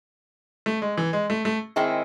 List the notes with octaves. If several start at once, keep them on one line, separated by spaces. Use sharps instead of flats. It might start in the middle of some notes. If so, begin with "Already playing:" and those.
A3
G#3
E3
G#3
A3
A3
D#3 G#3 C4 E4